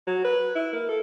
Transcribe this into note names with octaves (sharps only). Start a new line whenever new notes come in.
F#3
B4
E4
A#3
A4